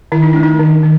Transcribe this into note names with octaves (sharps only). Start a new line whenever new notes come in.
D#3 E4
D#4
A3 D4
D#4
D#3
D#3